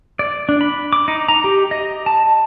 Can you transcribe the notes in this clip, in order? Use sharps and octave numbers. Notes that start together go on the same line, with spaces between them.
D5
D4
B5
D6
D#4
A#5
G4
D#5
A5